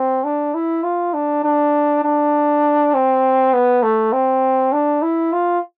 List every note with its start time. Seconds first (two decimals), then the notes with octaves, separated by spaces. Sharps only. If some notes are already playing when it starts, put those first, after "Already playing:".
Already playing: C4
0.24 D4
0.54 E4
0.83 F4
1.14 D4
1.44 D4
2.04 D4
2.94 C4
3.53 B3
3.83 A3
4.13 C4
4.73 D4
5.03 E4
5.33 F4